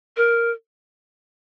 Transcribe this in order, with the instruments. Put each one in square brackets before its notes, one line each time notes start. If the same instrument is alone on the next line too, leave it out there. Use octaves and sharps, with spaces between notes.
[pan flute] A#4